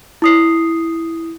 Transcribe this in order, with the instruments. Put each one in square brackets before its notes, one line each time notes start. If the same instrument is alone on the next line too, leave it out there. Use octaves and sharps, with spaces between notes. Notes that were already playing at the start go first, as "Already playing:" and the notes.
[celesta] E4 D#6 C7